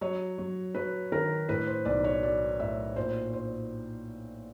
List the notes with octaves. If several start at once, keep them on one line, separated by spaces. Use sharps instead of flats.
F#3 C#5
F#3
F#3 B4
D#3 A#4
A2 B4
C5
B1 D5
C#5
F#3 D5
A2 E5
A#2 C5
C5